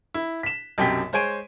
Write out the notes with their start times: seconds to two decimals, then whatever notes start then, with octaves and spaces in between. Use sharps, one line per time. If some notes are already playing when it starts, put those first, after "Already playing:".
0.14 E4
0.43 B6 E7
0.78 B1 F#2 C3 G5 G#5 B6
1.13 G#3 C5 C#5 G#5 D7 D#7